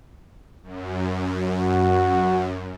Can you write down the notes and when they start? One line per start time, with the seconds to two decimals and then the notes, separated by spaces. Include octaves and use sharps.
0.63 F#2
1.49 F#4